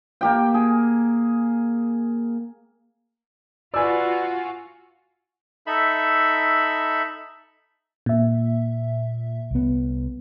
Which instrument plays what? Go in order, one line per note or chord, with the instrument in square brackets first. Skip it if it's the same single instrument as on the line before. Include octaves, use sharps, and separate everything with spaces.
[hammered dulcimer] A#3 G4 G5
G#4
[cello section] F4 F#4 [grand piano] B4 D5 [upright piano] G#5 E6
[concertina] D#4 A4 E5 B5
[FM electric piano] A#2 E5
[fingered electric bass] C2 B3